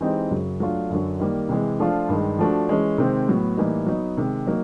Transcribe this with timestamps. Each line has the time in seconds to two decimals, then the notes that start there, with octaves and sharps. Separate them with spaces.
0.01 E3 G#3 C4 D#4 G4
0.31 F#2 C#3 F#3
0.60 F#3 A3 D4 F4
0.90 F#2 D3 F#3
1.20 D#3 G3 A#3
1.49 C3 E3 G#3
1.80 F3 A3 D4 F4
2.09 G2 D#3 G#3
2.39 F3 A3 D4 F#4
2.69 E3 G#3 C#4
2.98 C3 D#3 G#3 C4
3.28 A2 F#3 B3
3.57 A2 E3 G3 A#3 D#4
3.87 F#3 B3 D#4
4.17 C3 D#3 G#3
4.47 F#3 A#3 D#4